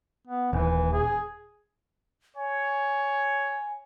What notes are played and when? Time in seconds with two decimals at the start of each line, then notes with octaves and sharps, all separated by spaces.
0.27 B3
0.53 D#1 E3
0.93 G#4
2.36 C#5 G#5